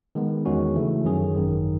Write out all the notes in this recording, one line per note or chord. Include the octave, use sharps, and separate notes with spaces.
D#3 G#3 B3
E2 D#3 G#3 C#4 F#4
C#3 E3 A3
F#2 D#3 F#3 C#4 G#4
G#1 F#2 D#3